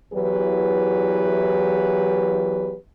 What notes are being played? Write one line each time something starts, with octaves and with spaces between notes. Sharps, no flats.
E2 E3 F#3 G4 B4